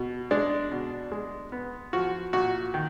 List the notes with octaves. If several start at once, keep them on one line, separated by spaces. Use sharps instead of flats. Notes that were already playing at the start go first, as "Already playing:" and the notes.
Already playing: B2
G#3 D4
B2
G#3
B3
F3 F#4
A#2 F#4
D#3